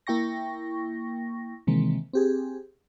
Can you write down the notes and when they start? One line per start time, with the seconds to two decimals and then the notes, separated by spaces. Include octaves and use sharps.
0.07 A#3 E4 G5 C#6 A#6
1.67 C3 D#3 E3 G#3 A#3 C4
2.13 C4 G4 G#4